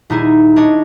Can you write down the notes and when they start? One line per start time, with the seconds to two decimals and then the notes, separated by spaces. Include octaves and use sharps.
0.10 D#1 D#4 E4 G#4 D#7
0.56 D4 C#5 D#5